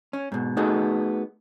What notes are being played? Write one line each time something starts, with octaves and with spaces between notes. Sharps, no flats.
C#4
G#2 B2
A3 B3 D#4 F#4 G#4